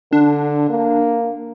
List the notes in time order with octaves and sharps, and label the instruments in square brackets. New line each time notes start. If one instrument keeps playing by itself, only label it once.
[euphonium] D3 [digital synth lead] D4
[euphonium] A#3